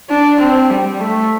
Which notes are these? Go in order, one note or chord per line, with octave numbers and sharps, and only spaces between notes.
D4
C4
G3
A3